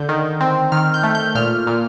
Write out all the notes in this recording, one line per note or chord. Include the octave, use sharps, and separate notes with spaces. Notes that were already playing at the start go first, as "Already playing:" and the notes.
Already playing: D3 G6
D#3
C4
D#3 F6
G6
A3
G6
A#2 F6
A#2